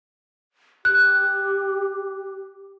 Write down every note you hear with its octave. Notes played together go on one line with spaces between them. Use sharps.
G4 F#6